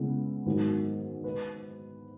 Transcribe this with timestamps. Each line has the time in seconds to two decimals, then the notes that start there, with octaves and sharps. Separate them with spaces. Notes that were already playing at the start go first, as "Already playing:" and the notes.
Already playing: C#3 G#3 B3 E4
0.46 G#2 D#3 F#3
1.24 B4